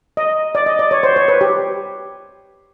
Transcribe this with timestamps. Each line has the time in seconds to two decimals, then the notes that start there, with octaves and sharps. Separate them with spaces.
0.17 D#5
0.55 D5
0.66 D#5
0.79 D5
0.91 C#5
1.03 C5
1.16 C#5
1.28 B4
1.41 G4